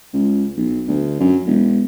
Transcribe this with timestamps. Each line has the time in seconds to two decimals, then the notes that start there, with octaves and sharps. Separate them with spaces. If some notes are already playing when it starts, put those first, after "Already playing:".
0.13 C#2
0.57 B1
0.88 D2
1.20 F#2
1.47 E1